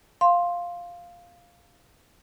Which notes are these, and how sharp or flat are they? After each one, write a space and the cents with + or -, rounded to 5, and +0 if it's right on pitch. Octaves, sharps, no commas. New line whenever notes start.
F5 +0 C6 +10